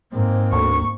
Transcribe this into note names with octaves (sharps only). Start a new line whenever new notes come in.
G#2 A#3 C4
D2 C#6